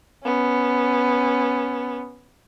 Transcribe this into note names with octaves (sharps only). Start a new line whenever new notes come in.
B3 C#4